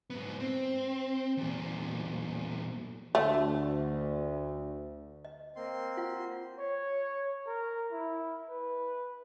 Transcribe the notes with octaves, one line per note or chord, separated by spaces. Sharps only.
G#2 B3
C4
E2 A#2
D2 A3
D#5
A#3 C4 C6
F4 F#5
C#5
A#4
E4
B4